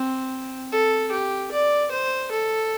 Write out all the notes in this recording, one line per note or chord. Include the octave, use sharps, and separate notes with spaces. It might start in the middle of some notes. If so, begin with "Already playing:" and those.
Already playing: C4
A4
G4
D5
C5
A4